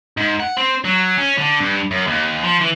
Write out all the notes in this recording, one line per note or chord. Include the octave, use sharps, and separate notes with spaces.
G#2
F#5
C4
F#3
C#4
D3
G2
F#2
D#2
F3
E3